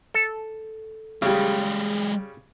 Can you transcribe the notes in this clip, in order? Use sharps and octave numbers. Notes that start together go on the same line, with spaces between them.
A4
C#3 G3 G#3 G4